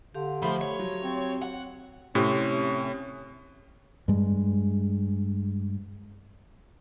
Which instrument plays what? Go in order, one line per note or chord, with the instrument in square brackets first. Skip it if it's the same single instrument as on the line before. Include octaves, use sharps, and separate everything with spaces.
[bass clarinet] D3 [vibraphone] G4 F5 C6
[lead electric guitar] F3 C5 [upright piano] A3 B5
[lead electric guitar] C#5
[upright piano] F#3
[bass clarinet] C4
[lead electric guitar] F#5
[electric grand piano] A2 [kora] C3 [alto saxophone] C#4
[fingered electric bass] G2 G#3